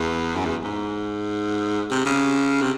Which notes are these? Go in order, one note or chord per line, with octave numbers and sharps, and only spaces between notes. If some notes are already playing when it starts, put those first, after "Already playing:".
Already playing: E2
F#2
E2
G#2
C3
C#3
C3